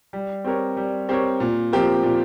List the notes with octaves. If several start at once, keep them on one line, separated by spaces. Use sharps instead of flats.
G3
C4 G4 A#4 C#5
G3
C4 G4 A#4 C#5
A#2
F3 C4 G4 A#4
A#2